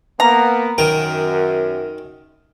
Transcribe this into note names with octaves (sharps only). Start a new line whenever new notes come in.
A#3 B3 A#5
F#2 D#3 A#4 G5